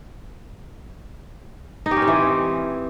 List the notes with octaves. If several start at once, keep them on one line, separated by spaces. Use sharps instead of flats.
D#4
G4
C#4
C4
E3